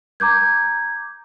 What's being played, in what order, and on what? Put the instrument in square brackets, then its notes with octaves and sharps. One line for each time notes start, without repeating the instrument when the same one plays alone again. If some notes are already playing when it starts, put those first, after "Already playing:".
[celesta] A#5 D6 G6 G#6